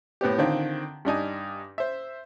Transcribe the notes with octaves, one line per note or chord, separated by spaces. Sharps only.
A2 B3 C4 G4
D3 D#3 C4 F4
G2 D4 D#4 G#5
C5 E5